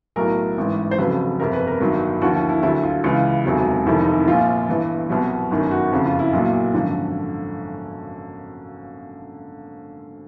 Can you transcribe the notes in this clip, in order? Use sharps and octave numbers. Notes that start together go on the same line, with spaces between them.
B1 A2 F#3 A#4
A1 G#2 E3
C5
F1 F2 C#3 F#3 B4
G1 F2 C3 A#4
B4
A#4
G1 G2 D#3 F#3
D#2 D3 F3 F#4
E4
E4
D2 D3 F#3 E4
F4
C#2 C#3 E3 F4
E1 D2 C3 D#3 F#3
F1 F2 C3 D#3 E4
D#4
E4
A#1 A#2 F3 F4
G1 G2 E3
C2 B2 F#3
G1 F#2 D#3
F#4
F#1 F2 C#3 F#4
F4
E4
B1 A#2 F#3 E4
G#1 F#2 D3 F3